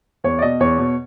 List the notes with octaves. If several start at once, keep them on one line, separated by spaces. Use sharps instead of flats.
E2 C#5
D5
B2 D#5
E2 C#5
B2